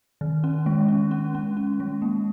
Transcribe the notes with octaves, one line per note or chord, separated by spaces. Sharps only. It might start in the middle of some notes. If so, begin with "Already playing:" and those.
D#3
C#4
G#3
C#4
C#4
C#4
C#4
G#3
A#3